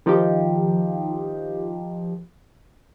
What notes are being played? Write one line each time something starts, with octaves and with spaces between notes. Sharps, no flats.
D#3 F3 D#4 F4 G4